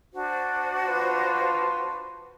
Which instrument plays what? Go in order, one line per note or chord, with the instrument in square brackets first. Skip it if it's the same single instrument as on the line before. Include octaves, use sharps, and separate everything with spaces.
[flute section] D4 F#4 C5
[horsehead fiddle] F4 B4 [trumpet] C6